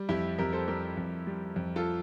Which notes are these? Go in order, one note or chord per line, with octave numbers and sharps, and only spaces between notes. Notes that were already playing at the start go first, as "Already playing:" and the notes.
Already playing: G3
F2 E4 G4
F2 G4 A#4
A4 C5
G3 G4 A#4
F2
G3
F2
F4 A4